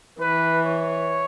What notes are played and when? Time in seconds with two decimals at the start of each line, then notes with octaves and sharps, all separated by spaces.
0.21 E3 B4
0.66 C#5